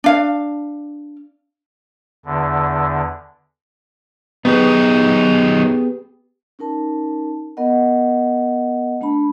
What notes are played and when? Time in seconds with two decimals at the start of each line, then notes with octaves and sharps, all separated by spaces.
0.04 D4 F5
2.25 E2 D3
4.45 F#2 B3 D#4 G4 G#4
6.59 C#4 D#4 A#4 A5
7.57 B3 A#4 D#5 F#5
9.01 A3 D4 A5 B5